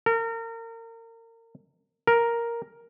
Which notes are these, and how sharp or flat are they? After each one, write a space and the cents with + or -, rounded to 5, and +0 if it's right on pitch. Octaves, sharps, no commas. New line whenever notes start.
A#4 -30
A#4 +5